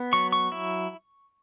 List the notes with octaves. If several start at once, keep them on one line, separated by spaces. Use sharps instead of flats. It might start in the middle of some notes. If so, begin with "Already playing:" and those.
Already playing: B3
F#3 C#6
C#6
E4